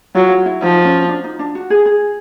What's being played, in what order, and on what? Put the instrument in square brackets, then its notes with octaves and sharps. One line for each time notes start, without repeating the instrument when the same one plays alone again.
[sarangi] F#3 [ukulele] F4
[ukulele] F4
E4
[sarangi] F3 [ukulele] D#4
[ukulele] C#4
D4
D#4
D4
F#4
G#4
G#4